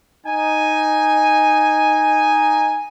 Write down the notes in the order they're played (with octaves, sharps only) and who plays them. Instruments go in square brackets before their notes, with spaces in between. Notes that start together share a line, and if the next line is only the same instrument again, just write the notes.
[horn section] D#4 G#5